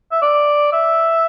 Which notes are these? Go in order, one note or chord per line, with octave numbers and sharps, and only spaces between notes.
E5
D5
E5